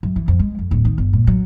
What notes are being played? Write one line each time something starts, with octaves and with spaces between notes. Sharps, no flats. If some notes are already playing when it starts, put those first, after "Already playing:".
F#2
E3
F2
G#3
F2
D1
D#3
G1
A#2
F#3